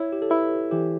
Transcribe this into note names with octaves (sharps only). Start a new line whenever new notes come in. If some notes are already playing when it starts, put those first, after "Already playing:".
Already playing: E4 C#5
G4
A4
E4 B4
E3 G4